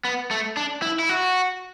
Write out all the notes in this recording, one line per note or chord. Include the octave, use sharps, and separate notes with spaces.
B3
A3
D4
E4
E4
F#4